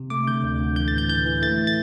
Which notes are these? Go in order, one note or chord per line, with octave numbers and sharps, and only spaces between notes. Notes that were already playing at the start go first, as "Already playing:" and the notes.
Already playing: C3
A3 D6
D3 G6
D2
D3
E3 G6
A2 A6
G6
E3 G6
E3
A3 A6
A6